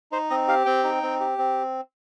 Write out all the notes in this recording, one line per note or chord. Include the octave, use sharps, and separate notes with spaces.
D#4 C5
C4 D#5
G4 F5
C4 G5
D#4
C4
G4
C4